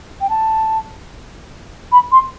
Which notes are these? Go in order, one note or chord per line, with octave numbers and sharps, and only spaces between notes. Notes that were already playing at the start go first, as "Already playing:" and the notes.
G5
A5
B5
C6